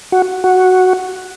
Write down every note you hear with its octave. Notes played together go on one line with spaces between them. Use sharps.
F#4
F#4